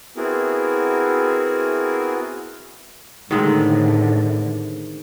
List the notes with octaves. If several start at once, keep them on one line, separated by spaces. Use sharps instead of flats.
B3 C4 E4 F#4 G#4 A#4
A2 D3 D#3 G#3 C4